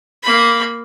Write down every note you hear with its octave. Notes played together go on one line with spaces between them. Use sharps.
A#3 B5